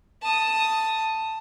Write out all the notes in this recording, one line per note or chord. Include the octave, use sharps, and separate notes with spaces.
A5 D#6